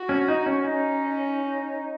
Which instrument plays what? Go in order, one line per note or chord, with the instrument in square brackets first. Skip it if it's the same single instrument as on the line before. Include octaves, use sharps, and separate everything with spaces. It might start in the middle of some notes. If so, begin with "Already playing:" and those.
Already playing: [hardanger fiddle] F#4
[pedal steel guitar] C#4
D#4
C#4
[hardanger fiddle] C#4 [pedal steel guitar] D#4